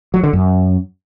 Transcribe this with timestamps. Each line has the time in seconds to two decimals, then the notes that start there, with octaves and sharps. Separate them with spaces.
0.14 F#3
0.23 D3
0.33 F#2